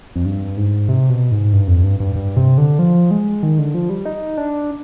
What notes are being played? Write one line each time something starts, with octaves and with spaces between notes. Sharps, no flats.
F2
G2
G#2
C3
B2
G#2
G2
F2
G2
G2
G2
C3
D3
F3
G#3
D#3
D3
F3
G3
D#4
D4